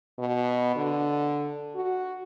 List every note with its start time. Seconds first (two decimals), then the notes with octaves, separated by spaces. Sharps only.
0.19 B2
0.75 D3
1.76 F#4